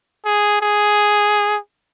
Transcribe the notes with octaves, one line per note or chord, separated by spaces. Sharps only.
G#4
G#4